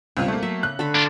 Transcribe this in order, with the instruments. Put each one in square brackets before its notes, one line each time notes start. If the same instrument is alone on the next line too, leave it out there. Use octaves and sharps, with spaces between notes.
[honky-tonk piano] C#2 F4 [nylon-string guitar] B2 G3 C4
[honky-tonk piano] A3 A#3
[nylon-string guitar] F#3 [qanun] E5
[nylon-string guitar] C#3 [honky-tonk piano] F#6
[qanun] D3 A3 B5
[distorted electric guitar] D4 F4 [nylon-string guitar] A5